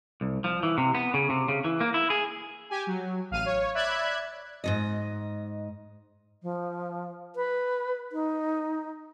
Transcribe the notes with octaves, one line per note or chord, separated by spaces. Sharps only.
C2
F3
E3
C3
B3
C#3
C3
C#3
E3
A#3
E4
G#4
G4 G#5
F#3
A1 F5 F6 D#7
C#5
D5 E5 B5 F#6 G#6
G#2 C3 D#5
F3
B4
D#4